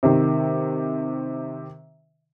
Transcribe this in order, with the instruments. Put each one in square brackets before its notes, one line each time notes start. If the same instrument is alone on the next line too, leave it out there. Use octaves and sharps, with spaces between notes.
[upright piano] C3 D#3